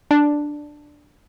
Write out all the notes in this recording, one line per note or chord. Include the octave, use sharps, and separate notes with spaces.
D4